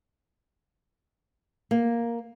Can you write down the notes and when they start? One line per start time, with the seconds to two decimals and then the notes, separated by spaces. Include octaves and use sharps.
1.71 A#3